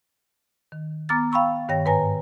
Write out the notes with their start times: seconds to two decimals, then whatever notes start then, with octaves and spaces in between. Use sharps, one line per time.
0.72 D#3
1.09 B3 A#5 D6 F6 A6
1.32 F5 G5 B5 C#6 E6
1.69 G2 D#3 C#5 G5 A#6
1.85 G#2 B4 C#5 G#5 A#5 A#6